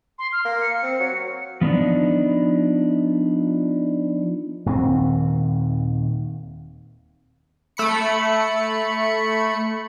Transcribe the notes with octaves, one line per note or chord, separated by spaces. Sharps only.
C6
F6
A#3
C#7
C4
F#3
F3 B3 D4 D#4
D#1 D#2 D#3 C4
A3 B5 C#7